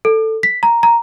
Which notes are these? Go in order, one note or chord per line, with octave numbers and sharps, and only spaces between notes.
A4
B6
A#5
A#5